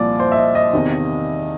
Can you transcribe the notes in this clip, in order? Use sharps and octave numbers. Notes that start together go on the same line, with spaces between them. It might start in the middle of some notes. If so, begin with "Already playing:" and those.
Already playing: C2 A#2 F3 D5
C5
E5
D#5
D#5
E2 C3 D#3